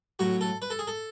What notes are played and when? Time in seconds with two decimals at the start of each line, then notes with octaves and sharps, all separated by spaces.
0.19 A2 F#3 F#4
0.41 A4
0.62 B4
0.70 A4
0.79 G#4
0.87 A4